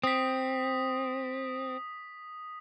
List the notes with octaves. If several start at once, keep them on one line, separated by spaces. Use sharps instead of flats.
C4 D#6 B6